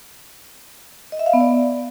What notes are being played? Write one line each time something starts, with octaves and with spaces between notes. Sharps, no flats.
D#5
E5
F5
B3
D5